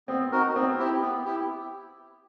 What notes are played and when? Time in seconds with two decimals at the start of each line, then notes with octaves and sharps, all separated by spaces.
0.08 B3 C4
0.32 D#4 F#4 A#4
0.55 B3 C4
0.79 E4 G4
1.02 B3
1.25 E4 G4